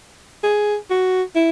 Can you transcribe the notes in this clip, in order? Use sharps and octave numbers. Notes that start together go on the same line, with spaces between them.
G#4
F#4
E4